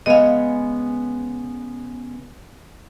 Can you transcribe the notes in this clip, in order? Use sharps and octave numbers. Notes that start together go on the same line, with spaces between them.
C#3 G#3 B3 D#5 F5